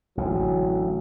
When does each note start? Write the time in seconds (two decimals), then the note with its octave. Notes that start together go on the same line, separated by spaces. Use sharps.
0.17 A1 D3 F#3